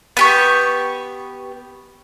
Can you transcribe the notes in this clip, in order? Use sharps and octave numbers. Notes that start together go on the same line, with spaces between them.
B3 G4 C#6